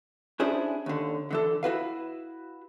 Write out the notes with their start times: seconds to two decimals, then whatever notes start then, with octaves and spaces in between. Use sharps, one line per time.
0.40 C#4 D4 E4 G#4 C5
0.86 D#2 D3
1.31 D3 E3 A4
1.63 E4 F#4 B4 F5